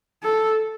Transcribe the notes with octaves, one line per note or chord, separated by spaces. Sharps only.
A4